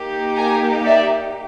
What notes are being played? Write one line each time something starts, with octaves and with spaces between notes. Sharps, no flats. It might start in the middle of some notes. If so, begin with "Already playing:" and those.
Already playing: A#3 D#4 G4
G#5 A#5
D5 E5